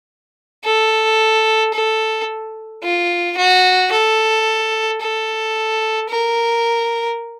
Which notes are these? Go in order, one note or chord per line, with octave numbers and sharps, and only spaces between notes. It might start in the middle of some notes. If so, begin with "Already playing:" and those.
A4
A4
F4
F#4
A4
A4
A#4